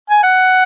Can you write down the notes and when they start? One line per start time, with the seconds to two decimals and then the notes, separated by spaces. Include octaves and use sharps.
0.10 G#5
0.23 F#5